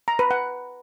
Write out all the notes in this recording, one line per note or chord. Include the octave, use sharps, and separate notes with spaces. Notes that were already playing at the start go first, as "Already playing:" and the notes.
A#5
B4
F#5